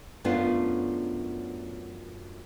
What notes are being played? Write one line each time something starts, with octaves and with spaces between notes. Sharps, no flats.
F#2 A3 B3 C#4 D4 F4